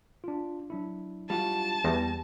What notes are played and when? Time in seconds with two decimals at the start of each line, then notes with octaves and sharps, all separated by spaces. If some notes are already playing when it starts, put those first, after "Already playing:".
0.24 D4 F4
0.70 F#3 D4 E4
1.30 G3 F4 F#4 A5
1.84 E2 G3 B3 A#6